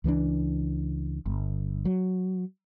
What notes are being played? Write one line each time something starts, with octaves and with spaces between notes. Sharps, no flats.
C#2 E3 G3 D4
G1
F#3